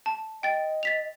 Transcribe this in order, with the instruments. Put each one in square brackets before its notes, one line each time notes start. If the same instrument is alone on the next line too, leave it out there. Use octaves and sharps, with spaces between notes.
[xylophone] A5
[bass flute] D#5 [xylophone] G5 A6
[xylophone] A6 B6 F7